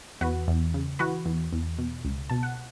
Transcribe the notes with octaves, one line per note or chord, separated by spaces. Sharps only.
E2 F#4 B4
E2
C#3
E3 F#4 B4
E2
E2
B2
C#2
B2 A5
F#5